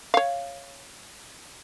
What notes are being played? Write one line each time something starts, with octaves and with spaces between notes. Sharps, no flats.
C#5 F5